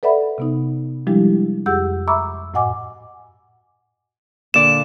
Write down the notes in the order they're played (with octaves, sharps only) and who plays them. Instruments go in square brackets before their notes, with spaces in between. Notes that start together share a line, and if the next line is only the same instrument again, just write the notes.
[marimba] A4 B4 D5 E5 F#5 B5
C3 B3 D#4
F3 G3 G#3 D4 E4 G4
F2 G4 G#4 F#5 E6 G6
E5 A#5 B5 C#6 D6 E6
F#2 A2 D#5 F#5 G#5 D6
[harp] A#2 D3 D5 [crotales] E7